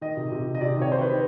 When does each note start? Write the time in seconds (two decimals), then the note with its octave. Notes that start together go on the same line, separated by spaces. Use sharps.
0.01 D#3 D#5
0.17 C3
0.32 C3
0.46 C3
0.55 D#5
0.61 C3 D5
0.76 D#3
0.82 C#5
0.92 D#3 C5
1.01 B4
1.06 D#3